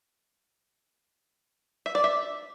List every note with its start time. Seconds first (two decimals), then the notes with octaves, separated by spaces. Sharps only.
1.86 E5
1.95 D5
2.04 E5